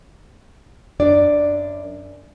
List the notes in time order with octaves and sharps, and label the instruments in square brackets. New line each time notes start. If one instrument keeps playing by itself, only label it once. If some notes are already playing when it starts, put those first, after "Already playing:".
[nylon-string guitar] F#2 D4 D5